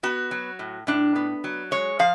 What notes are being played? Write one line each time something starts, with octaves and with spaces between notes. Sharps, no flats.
B3 F#4
F#3
A2
A2 D4
B3
F#3
G#3 C#5
F3 F5